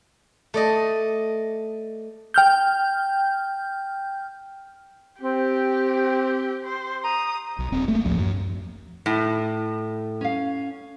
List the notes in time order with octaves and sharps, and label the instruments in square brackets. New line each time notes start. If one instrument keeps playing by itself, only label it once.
[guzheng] A3 D5 D#5
[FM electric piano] G5 F6 G6
[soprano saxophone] C4 [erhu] G4
[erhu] C5
[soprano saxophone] A#5 [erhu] D#6
[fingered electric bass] B1
D#1 C4
A3 A#3
A1 D2 F3
F#2
[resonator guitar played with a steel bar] A2
[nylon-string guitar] C#4 F5